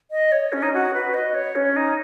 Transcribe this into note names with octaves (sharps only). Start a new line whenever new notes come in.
D#5
C#5
C#4
D#4
F#4
B4
D#5
C#5
C#4
D#4